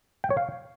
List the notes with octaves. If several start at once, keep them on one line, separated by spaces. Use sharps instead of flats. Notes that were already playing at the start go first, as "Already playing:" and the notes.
G5
C#5
F5